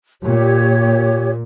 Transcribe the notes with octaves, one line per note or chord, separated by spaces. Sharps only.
A#2 G4 C#5